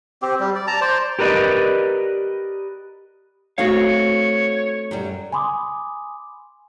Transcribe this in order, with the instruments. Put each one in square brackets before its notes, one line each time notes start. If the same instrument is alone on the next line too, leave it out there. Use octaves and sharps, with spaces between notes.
[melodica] C4 G4
G3
D5
A5 A#5
C5 D5
[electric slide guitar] G4 A#4 B4 D5 D#5
[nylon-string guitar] A3 C4 D#4 [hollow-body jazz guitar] F#4 F5 [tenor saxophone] C#5
[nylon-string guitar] F#2 G3
[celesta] G#5 B5 C6 D6 D#6